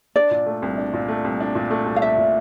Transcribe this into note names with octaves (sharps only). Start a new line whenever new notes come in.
D4 D5
A#2
A3
C2
D4
A#2
A3
C2
D4
A#2
A3
C2
F5
D4 E5
A#2